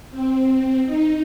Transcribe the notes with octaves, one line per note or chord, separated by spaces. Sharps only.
C4
D#4